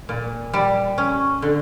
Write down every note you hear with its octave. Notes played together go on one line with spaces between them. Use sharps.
A#2
G3
C#4
D3